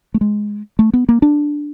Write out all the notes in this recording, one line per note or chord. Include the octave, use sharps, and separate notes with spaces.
A3
G#3
A3
B3
A#3
D4